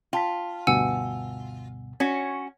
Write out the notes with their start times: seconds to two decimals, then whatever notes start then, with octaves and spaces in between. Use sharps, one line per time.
0.13 F4 G5 A5 B6
0.67 D2 G2 B2 F#5 G#5 E6
2.00 C#4 F#4 C#5 G#6 B6